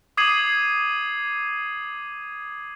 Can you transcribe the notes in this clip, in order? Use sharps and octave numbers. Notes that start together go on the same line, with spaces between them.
D6 D#6 G#6 C7 D#7 F#7